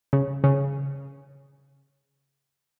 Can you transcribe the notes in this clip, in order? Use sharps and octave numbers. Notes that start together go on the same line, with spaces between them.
C#3
C#3